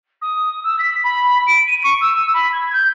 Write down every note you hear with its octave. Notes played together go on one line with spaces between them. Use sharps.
D#6
E6
B6
B5
D7
D#7
C#6
E6
B5
G#6
G6